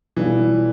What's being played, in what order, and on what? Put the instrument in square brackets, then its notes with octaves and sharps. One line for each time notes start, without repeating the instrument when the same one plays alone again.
[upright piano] B1 B2 G3 D4 F4 [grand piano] E3